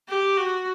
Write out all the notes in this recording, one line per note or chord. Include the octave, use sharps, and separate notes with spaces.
G4
F#4